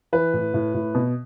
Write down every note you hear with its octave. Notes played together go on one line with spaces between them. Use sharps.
E3 B4
A2
A2
A2
B2